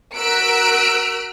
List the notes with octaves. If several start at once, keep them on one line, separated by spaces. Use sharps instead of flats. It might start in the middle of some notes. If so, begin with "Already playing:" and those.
F#4 A#4 E6 F#6 B6 D7